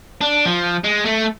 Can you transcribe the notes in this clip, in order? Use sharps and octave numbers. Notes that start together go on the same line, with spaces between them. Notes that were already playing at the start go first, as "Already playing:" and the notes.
D4
F3
G#3
A3